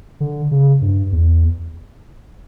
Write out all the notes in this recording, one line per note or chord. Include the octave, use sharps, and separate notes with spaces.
D3
C#3
G2
E2